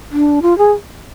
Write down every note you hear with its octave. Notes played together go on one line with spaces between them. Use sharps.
D4
F4
G#4